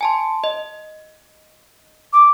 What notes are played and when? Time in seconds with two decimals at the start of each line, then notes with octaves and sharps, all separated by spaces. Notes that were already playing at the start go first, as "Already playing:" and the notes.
0.01 G#5 A5 C6
0.44 D#5
2.13 D6